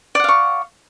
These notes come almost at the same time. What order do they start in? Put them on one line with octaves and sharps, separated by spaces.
D5 F#5 F5 C#6